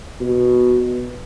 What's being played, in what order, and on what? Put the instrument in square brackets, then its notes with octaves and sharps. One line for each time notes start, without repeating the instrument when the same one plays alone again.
[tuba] B2